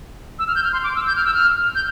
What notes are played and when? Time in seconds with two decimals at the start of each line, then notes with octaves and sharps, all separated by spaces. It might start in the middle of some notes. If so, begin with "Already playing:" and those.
0.39 E6
0.48 F6
0.55 G6
0.64 F6
0.73 C6
0.84 D6
0.96 E6
1.07 G6
1.16 F6
1.25 E6
1.34 F6
1.75 G6